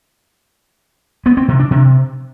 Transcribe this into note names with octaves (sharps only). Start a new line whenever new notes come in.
B3
C4
C3
D4
C3